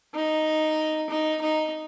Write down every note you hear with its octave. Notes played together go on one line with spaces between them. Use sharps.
D#4
D#4
D#4